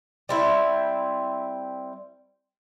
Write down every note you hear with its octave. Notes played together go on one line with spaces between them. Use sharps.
G3 C4 E4